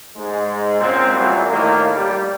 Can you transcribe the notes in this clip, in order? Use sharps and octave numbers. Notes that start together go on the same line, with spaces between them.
G#2 G#3
A#2 C#3 C4
A#2 E3 F#3 G3 A#3
A2 D#3 A#3
G3